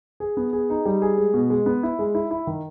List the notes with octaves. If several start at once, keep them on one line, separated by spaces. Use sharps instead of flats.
G#4
B3
G#4
D#4
G3
G#4
G#3
B2
G#3
B3
E4
G#3
E4
E4
D#3